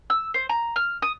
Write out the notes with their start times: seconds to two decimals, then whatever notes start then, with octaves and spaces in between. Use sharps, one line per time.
0.10 E6
0.34 C5
0.49 A#5
0.76 F6
1.02 D#6